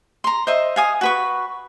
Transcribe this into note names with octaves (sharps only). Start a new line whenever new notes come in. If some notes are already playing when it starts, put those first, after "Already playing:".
A#5 C6
C5 D#5 E5
F5 G#5 D#6
F#4 B4 C#6